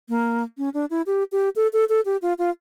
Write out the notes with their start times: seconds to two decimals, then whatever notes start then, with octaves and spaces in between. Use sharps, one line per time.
0.09 A#3
0.58 C#4
0.74 D4
0.90 E4
1.06 G4
1.32 G4
1.56 A4
1.73 A4
1.89 A4
2.05 G4
2.22 F4
2.38 F4